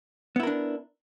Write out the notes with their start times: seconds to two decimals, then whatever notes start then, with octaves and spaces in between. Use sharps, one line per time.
0.36 B3
0.40 E4
0.43 A#4
0.47 D4